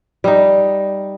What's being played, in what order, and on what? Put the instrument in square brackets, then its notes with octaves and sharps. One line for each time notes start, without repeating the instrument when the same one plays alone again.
[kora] G3 D#4